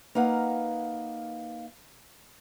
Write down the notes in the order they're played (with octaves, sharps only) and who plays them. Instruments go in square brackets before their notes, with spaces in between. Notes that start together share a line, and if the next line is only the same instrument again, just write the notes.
[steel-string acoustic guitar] A#3 D#4 B4 F5 F#5